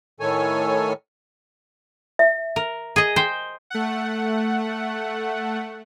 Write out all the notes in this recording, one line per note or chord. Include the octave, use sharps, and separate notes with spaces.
A2 D#3 A4 C#5 G#5
E5
A#4
G#4 D#5
C5 G5
A3 F#5